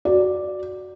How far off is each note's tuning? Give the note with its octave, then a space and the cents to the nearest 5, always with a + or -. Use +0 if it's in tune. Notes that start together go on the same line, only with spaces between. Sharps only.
F#4 +5 D5 +0